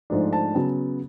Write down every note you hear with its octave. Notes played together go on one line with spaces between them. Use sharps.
G#2 F3 A3 D4
A5
C#3 F#3 B3